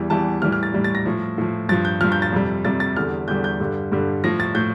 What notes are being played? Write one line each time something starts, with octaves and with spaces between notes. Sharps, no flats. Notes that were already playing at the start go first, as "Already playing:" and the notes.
Already playing: E2 E3 G3
E2 E3 G3 A5
A2 E3 G3 F6
F6
A6
A2 E3 G3
A6
A#6
A2 F3
A2 F3
G2 F3 A6
G6
G2 F3 F6
G6
A6
F2 C3 G3
F2 C3 G3 A6
A6
E2 D3 G3 F6
E2 D3 G3 G6
G6
G2 D3 G3
G2 D3 G3
A2 F3 A#6
A6
A2 G6